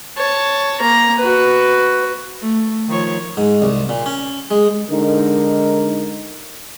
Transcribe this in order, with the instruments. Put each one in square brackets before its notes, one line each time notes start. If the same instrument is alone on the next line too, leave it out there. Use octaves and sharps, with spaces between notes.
[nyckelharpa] C#5 A5
A#3 A#5
F#4 B4
[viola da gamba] A3
D#3 F3 C#5
[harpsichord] G#2
C2
A#2
C#4
G#3
[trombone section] D3 G#3 D#4 A#4